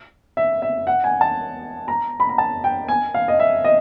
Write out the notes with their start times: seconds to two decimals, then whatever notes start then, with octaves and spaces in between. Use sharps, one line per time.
0.37 E5
0.62 E5
0.87 F#5
1.04 G#5
1.21 A5
1.88 A#5
2.20 B5
2.29 A#5
2.38 A5
2.64 G5
2.88 G#5
3.14 F5
3.28 D#5
3.40 E5
3.64 D#5